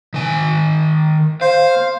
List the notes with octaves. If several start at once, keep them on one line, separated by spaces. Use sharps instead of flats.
D#3 G#5
C5 F5